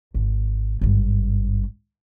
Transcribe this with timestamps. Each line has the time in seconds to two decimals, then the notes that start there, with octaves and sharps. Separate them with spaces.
0.14 G#1
0.81 G#1 G2